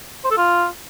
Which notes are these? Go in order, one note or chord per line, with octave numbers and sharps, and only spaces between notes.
C5
A4
F4